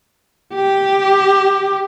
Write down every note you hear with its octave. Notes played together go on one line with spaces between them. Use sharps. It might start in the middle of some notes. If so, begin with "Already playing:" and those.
G4